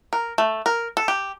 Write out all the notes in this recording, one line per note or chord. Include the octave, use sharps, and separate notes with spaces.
A#4
A3
A#4
A4
G4